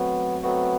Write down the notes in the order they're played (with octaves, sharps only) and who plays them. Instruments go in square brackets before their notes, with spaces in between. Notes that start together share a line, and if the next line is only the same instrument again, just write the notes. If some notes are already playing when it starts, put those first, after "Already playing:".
Already playing: [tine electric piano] F#3 A3 C4 F#4 [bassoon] B3
[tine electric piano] F#3 A3 C4 F#4 [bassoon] B3